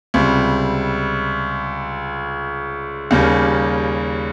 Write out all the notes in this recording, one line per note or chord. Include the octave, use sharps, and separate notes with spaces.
C#2 C3 G3
D#2 C#3 G3 A#3